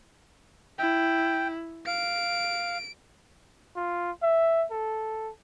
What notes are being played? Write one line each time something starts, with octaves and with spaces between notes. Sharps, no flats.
E4 G5
F5 D7
F4
E5
A4